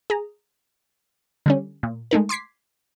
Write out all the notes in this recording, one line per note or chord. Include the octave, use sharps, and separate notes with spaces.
G#4 A#5
D3 G3 C#4
A#2
G#3 A3 D#4 A#4
C6 D6 G#6 B6 C7